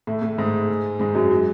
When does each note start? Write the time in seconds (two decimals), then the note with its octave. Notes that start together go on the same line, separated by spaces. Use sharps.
0.07 A2 A3
0.22 A2 A3
0.38 G#2 G#3
0.99 G#2 G#3
1.15 F#2 F#3
1.31 F#3